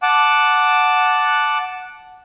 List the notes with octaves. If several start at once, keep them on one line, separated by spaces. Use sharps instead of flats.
F#5 A5 D6